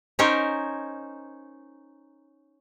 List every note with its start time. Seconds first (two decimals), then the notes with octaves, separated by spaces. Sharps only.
0.19 C#4 D#4 A#4 C5 C#5